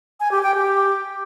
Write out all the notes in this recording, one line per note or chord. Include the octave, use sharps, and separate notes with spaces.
G#5
G4
G5
G4